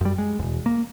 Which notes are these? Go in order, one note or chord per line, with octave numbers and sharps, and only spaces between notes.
F#2 G3
G#3
E1 E2
A#3